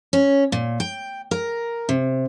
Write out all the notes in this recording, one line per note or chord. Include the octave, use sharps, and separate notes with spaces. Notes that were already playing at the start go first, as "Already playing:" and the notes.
C#4
A#2
G5
A#4
C3